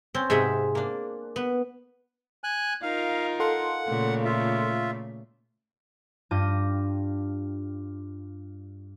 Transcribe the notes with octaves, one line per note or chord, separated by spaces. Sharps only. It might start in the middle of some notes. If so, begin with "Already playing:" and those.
C4 C#4
G#2 C3 G#4 E5 F#5
A#3 D4
B3
G#5 F#6
D#4 F4 A#4 F5
A4 F5 F#5 C6
A#2 C#3 A3
F4 E5
G2 F4 G4 D6 A#6 D#7